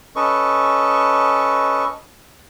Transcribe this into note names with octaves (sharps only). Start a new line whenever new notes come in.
C#4 A4 B4 D#5 C#6